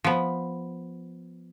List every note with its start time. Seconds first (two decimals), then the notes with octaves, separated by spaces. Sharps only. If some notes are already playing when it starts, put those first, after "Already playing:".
0.04 F3 B3